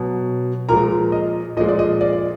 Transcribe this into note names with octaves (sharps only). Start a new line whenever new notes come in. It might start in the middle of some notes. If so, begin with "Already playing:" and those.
Already playing: B2 F#3
A#2 F3 G#3 A#4 A#5
D#5
A#2 F3 G#3 D#5
D5
D#5
D5
D5